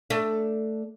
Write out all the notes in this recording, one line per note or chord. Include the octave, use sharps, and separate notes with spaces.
A3 D4